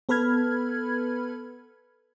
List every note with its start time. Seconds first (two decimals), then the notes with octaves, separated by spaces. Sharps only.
0.09 B3 A4 B4 B5 F6 G#6